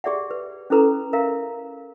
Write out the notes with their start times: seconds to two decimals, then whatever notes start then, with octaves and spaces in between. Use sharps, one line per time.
0.04 G4 G#4 D5 E5 F#5
0.31 B4
0.70 C#4 E4 G#4 A4 B4 A#5
1.13 A#4 E5 F5 A#5